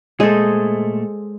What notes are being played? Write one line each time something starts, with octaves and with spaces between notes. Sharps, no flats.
A#2 G#3 A3 G#4 A4 C5 D#5